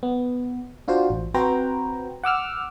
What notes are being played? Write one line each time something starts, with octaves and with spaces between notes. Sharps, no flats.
B3
D4 F4 F#4 C5
A1
C4 F#4 B4 C5 G5 A#5
F#5 D6 E6 F6